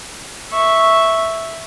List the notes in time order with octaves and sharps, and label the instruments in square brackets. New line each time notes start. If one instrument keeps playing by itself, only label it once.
[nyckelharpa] E5 C#6